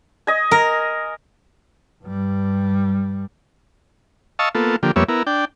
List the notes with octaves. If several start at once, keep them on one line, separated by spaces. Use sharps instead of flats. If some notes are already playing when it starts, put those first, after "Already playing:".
D#5 G#5
A#4
G2 G3
D#5 F5 A5 C#6 E6
A#3 B3 F4 A4
D3 F3 A#3 G4
F2 G3 A#3 B3 C#5 E5
B3 E4 A#4
D4 G5